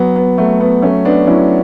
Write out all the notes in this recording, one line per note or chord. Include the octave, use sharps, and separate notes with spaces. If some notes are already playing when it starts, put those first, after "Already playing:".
Already playing: F#3 B3
B3
F#3 A3
B3
F#3 A3 C#4
B3 D4
F#3 C#4 E4